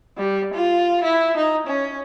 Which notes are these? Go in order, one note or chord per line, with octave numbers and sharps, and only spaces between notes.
G3
F4
E4
D#4
C#4